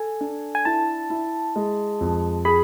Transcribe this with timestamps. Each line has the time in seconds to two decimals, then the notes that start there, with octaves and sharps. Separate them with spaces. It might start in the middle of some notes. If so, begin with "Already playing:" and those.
Already playing: A4 G#5
0.21 D4
0.55 G#5
0.65 E4 A5
1.10 E4
1.56 G#3
2.01 F2
2.45 G#4 B5